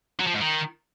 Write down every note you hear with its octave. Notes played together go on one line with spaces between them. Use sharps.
F#3
F3
G#2
D#3